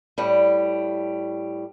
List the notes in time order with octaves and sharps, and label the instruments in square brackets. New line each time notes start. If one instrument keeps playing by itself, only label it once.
[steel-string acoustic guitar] A2 G3